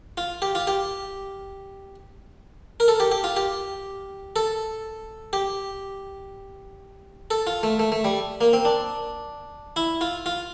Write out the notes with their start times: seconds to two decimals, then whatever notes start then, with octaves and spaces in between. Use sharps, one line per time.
0.17 F4
0.42 G4
0.55 F4
0.67 G4
2.80 A#4
2.88 A4
3.00 G4
3.12 G4
3.24 F4
3.37 G4
4.36 A4
5.33 G4
7.31 A4
7.47 F4
7.63 A3
7.79 A3
7.92 A3
8.05 G3
8.41 A#3
8.53 C4
8.65 D4
9.76 E4
10.01 F4
10.26 F4